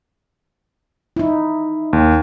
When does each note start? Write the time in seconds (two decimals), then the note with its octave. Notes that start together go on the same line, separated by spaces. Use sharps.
1.17 D#4 E4
1.93 D#2